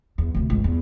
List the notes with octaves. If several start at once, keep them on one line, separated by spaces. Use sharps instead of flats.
E2
D2 C3
G#1 C#2
E2